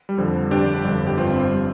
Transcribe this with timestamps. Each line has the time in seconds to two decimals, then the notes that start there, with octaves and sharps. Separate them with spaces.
0.09 G3
0.17 F2 D3 F3
0.51 G1 G2 G3 D4 G4
0.84 G1 F2 D3 G3
1.07 G4
1.18 G1 G2 F3 C4 F4
1.53 G3